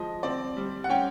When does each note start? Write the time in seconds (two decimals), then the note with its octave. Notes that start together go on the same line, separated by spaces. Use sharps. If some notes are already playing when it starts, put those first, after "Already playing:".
Already playing: F3 G#3 D#5
0.23 C4 D5
0.56 G3
0.84 F#5
0.89 C#4 G5